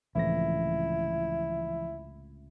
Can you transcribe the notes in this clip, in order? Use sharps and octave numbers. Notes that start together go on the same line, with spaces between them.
C#2 A2 C3 E3 F3 E4 A#6